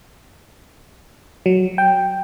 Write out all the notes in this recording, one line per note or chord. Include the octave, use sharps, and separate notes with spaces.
F#3
G5